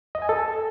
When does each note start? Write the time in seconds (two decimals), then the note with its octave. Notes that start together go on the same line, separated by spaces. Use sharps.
0.15 D#5
0.22 G#5
0.29 A4